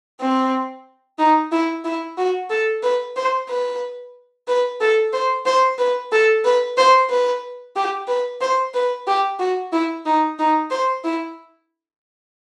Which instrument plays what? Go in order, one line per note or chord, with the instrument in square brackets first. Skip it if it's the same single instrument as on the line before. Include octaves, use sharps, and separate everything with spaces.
[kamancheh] C4
D#4
E4
E4
F#4
A4
B4
C5
B4
B4
A4
C5
C5
B4
A4
B4
C5
B4
G4
B4
C5
B4
G4
F#4
E4
D#4
D#4
C5
E4